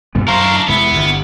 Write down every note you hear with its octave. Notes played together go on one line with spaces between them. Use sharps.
G2 G3 B3
F#2 A#4 C5 F5 A#5 C#6
D4 E4
E2 C3 G#3 B3 E4
G1 G2